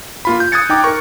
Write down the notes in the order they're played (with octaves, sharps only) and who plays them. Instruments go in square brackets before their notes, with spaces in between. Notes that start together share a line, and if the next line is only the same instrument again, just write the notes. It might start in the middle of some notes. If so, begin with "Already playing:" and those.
[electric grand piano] A#3 F4 B5
G6
D#6 F#6 G#6 A6 C#7
D#4 G5 D6
A#4 C#6